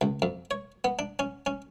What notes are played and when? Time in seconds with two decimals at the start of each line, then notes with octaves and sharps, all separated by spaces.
0.01 C#2
0.22 F2
0.51 C#5
0.84 B3
0.99 D4
1.19 C#4
1.46 C#4